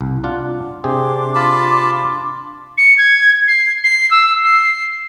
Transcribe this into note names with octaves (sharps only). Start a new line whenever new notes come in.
C2
D4 F4 F#5
C3 D4 G4 G#4 C6 D6
F4 A5 B5
C#7
G#6
C7
C7
E6
C7